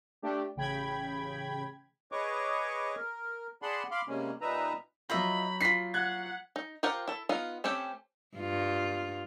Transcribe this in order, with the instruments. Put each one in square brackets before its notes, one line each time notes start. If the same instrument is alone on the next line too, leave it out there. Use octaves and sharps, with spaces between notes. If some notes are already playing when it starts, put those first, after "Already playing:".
[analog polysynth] A3 D4 G4
A1 C#3 G5 B5 G#6
[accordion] G#4 B4 C#5 D#5 C#6 D6
A#4
G#4 D5 F#5 A5 B5 C6
F5 B5 C6 D6
C3 G3 G#3 A#3 C#4
A#2 G3 D#4 B4 E5 A#5
[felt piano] F#3 G6 [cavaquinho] F4 D#5 E5 [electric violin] B5
[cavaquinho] D#4 F4 [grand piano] B6 C7
[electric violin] F#5 [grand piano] F#6 G#6
[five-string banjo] D#4
F4 G4 A#4 C5 F#5
E4 A4
B3 D#4 F4 F5
A3 C4 C#4 G4
[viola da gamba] G2 F4